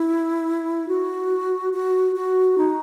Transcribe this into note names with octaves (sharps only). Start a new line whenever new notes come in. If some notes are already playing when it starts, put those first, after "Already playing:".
Already playing: E4
F#4
F#4
F#4
D#4